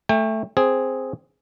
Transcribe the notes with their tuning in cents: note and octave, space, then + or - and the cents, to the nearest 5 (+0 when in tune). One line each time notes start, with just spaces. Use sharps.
A3 +0 G5 +35
C4 +0 G#4 +0